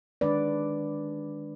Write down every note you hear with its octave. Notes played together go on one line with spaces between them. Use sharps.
D#3 G#3 D4 B4 D5